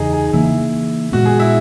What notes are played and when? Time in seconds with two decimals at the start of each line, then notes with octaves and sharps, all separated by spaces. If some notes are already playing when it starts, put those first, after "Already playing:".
Already playing: E2 C#3 E3 D#4 G#4
0.13 G#4
0.33 C#3 E3 A#3 E4
1.12 A#2 G#3 B3 F#4
1.26 G#4
1.39 E4